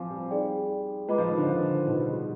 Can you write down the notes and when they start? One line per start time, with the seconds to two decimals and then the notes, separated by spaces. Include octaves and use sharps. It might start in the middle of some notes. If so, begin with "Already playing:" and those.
Already playing: F3 C4 C5 F5 G#5 D6
0.10 G3
0.30 D#4 G#4 D5 G5
1.08 G#3 F4 B4 D#5 B5 D6
1.18 F3
1.28 D#3
1.38 D3
1.47 F3
1.86 B2 D#4 G#4 B4
2.00 G3
2.12 G3